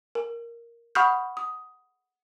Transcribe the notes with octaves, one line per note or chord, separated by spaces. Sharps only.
A#4
F#5 B5 C#6 D#6 F6 G6
D#6